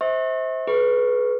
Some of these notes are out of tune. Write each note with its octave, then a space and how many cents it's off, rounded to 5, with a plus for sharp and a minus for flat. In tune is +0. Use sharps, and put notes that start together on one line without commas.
C5 +0 E5 -40 C#6 -40
G#4 +40 B4 +0 C#6 +0